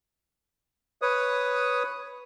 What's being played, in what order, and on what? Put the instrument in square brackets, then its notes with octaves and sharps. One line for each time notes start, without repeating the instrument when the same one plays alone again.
[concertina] B4 C#5 D#6